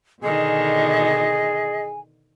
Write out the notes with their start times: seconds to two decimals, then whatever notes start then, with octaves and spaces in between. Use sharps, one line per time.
0.23 B2 D3 D#3 G#4 D#5 G#5